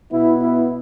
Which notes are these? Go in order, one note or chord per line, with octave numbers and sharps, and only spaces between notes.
B2 B3 E4
E4